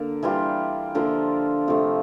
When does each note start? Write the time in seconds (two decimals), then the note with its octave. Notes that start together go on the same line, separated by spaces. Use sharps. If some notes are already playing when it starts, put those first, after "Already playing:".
Already playing: D3 A#3
0.23 E3 G3 D4 F4
0.95 D3 F3 A#3 F4
1.67 C3 F3 A3